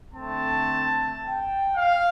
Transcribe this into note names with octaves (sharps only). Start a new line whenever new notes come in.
D3 A3 C4 A5
G5
F5